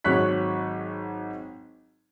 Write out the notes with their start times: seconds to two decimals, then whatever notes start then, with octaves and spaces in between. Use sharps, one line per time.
0.04 G#1 F#3 C#5 C#6 F#6 B6